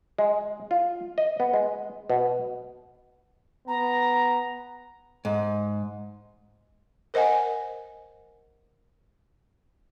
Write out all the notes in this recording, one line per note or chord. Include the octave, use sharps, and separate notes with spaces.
G#3
F4
D#5
B3
G#3
B2
B3 A#5
G#2
A#4 C5 D#5 F#5 G#5